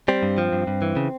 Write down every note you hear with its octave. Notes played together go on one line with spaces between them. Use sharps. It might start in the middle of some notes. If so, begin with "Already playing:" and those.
G3 C4
G2
F3
G2
G2
E3
C#3